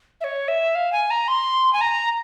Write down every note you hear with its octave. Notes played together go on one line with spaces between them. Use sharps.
E5
C#5
E5
F5
G#5
A#5
C6
G#5
A#5